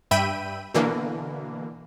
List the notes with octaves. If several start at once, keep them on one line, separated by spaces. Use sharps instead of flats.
G2 E5 G5 B5 D#7
B2 D3 E3 A#3